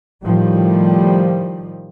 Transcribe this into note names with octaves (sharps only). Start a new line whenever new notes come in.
A2 D#3 F3 G3